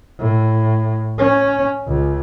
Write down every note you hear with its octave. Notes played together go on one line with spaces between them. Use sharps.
A2
C#4
C#2